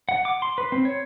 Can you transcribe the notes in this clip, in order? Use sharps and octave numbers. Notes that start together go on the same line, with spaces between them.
F#5
D6
C6
B4
C4
C#5